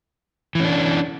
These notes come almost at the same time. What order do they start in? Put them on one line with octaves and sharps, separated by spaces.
E3 C#4 D4